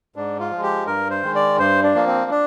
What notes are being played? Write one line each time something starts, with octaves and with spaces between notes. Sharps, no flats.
G#2 D4
F4
F3
G#3
G4
G2 A#4
C5
D#3 G#3
D5
G2 C5
D4
F3 A#3
C4
D4